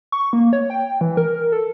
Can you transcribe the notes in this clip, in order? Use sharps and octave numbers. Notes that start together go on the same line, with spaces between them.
C#6
A#3
C#5
G5
E3
A#4
A4